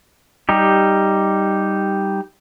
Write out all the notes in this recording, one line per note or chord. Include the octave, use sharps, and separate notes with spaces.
G3 D#4 G4